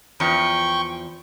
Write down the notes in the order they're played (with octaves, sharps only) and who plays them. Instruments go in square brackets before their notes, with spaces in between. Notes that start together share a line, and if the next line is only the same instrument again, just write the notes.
[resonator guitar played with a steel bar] E2 F3 [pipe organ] G5 C#6